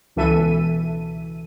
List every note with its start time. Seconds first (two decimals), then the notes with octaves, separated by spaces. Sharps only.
0.16 C#2 B2 E3 A4 E5 D#7